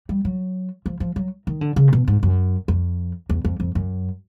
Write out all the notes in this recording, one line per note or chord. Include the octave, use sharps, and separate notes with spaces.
G3
F#3
F3
F3
F#3
D#3
D3
C#3
A#2
B2
G#2
F#2
F2
E2
F2
F2
F#2